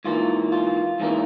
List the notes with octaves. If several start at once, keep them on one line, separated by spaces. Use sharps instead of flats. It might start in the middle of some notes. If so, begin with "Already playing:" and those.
G#2 E3 A#3 F4
F4
G#2 E3 A#3